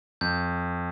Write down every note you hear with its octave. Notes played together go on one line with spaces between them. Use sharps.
F2 G6